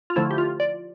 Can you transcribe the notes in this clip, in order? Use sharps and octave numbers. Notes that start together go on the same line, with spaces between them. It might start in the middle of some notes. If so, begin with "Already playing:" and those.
F4
D3 F3 A3 E4
G4
F4
D5